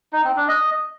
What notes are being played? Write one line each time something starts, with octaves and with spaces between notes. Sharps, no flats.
D#4
C4
D4
D#5